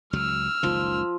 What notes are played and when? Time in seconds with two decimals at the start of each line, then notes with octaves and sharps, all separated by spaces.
0.13 C#2 F#3 E6 F6
0.63 F#1 C#2 D#3 F3